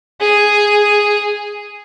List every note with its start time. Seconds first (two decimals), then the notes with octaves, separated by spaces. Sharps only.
0.21 G#4